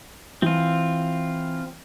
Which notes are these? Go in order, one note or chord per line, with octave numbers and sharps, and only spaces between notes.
E3 C4 F4